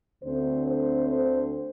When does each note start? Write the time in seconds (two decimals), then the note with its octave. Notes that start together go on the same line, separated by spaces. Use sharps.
0.23 D2 D3 A3 C4 C5
0.67 C5
1.09 C5